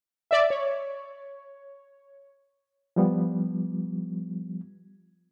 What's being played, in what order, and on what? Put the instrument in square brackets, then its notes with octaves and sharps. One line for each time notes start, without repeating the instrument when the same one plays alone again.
[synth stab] D5 E5
C#5
[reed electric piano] F3 G3 B3